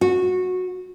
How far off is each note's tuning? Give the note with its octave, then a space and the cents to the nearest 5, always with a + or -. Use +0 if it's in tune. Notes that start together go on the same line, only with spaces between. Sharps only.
F#4 -15